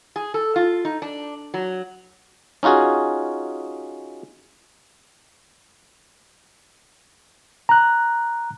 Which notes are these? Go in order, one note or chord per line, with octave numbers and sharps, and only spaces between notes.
G#4
A4
F4
D#4
D4
F#3
C#4 D#4 F4 F#4 G#4
A#5 F#6